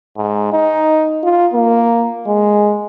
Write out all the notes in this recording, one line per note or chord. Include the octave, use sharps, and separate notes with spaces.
G#2
D#4
F4
A#3
G#3